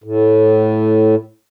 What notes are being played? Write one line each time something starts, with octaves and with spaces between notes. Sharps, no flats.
A2